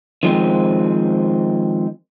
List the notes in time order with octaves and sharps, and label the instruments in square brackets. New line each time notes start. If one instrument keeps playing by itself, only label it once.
[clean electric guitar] D#3 F3 G#3 C4